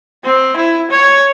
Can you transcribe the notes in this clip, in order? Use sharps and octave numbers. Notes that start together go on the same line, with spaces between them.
C4
E4
C#5